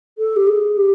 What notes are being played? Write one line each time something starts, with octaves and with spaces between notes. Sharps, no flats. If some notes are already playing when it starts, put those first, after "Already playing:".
A4
G4
G#4
G4